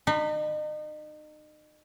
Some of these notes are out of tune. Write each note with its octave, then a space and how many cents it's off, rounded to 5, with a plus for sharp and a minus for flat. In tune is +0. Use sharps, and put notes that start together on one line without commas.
D#4 -35 B5 +0